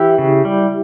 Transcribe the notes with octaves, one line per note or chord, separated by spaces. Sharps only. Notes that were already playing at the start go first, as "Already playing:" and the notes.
Already playing: E3 E4 G4
C#3
G3